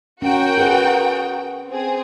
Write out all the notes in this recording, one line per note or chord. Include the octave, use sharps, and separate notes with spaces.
C#4 F#4 A#4 G5
G#4 B4 F#5
C4 G#4